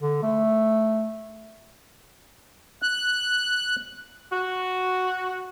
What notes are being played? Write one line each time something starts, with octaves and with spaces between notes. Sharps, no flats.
D3
A3
F#6
F#4